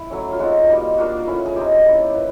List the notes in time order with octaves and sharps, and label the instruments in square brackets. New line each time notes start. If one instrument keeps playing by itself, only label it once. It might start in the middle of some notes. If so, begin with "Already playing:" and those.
Already playing: [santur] E4
F#3 A3 C#4
F4
G#3 C4 D#4 F#4
G3 A#3 D#4
A#3 D4 F4 F#4
A3 C#4 E4
G#4
G#3 C4 D#4 G4
A#3 C#4 E4
F3 B4